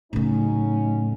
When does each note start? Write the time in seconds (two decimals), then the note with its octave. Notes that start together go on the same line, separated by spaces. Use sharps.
0.13 A2 C#3 F#3 A3 C#4 D#4